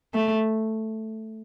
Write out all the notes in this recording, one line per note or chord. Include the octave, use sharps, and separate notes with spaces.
A3